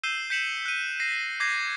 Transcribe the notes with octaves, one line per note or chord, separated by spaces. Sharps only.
E6 G6 C7 D#7 E7 G7
G6 B6 C#7 E7 F#7
F#6 D#7
A#6 C7
D6 G6 G#6 A#6 C7